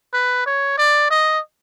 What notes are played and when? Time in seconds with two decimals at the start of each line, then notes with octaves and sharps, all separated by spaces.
0.14 B4
0.46 C#5
0.78 D5
1.10 D#5